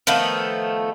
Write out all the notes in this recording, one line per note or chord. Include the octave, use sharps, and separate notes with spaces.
D#3 F3 A3 B3